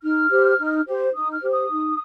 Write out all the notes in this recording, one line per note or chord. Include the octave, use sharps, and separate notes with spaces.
D#4 F6
G4 C5
D#4
G4 C5
D#4 D#6
F6
G4 C5
D#6
D#4